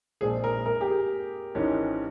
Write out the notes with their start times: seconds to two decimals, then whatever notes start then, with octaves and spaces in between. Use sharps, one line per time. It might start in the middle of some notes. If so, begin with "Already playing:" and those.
0.21 A#1 A#2 F3 G#3 C4 G#4
0.44 A#4
0.66 A#4
0.81 G4
0.88 G#4
1.55 G#1 G#2 E3 G#3 C#4